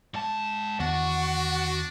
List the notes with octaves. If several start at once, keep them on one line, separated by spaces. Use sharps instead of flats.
G#2 A5
E2 D#3 B3 D4 F#4